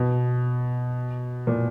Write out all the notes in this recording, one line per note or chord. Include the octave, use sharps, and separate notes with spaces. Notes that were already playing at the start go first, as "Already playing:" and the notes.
Already playing: B2
A#2